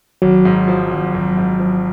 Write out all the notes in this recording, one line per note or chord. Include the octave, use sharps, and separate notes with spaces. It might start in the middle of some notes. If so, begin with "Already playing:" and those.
G#1 F#3
G#2
F3
G#1
G#1
G#2
F3